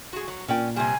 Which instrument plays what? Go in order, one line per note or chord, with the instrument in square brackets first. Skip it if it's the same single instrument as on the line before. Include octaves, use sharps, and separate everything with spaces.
[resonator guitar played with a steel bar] F#4 G#4
F#3
[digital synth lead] A#2 [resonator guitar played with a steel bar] C#4 D5 G5
[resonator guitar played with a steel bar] C3 G3 [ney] G#5